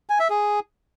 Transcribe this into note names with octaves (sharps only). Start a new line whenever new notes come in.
G#5
E5
G#4